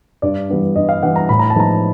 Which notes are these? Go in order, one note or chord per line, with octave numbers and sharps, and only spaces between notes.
G2 D5
E3 G3 B3 D4
G2 D#5
F5
E3 G3 B3 D4 F#5
A#5
A2 B5
A#5
A5
F3 G#3 B3 D#4 A#5